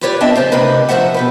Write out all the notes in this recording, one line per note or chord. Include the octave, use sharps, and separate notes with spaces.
E4 F4 G4 B4 C#5 D5
B3 C4 D4 D#5 E5 A5
F2 G#2 C#3 C4 F4
D2 C3 D4 E4 B4 D#5
F#2 A#2 F3 C5 E5 F#5
B2 G4 B4